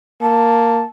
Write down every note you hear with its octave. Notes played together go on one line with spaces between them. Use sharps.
A#3 A5